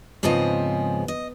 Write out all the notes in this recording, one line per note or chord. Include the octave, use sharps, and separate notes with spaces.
G#2 C#3 F3 B3 C4 D#5
D#5